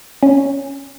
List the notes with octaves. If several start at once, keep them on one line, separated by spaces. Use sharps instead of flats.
C#4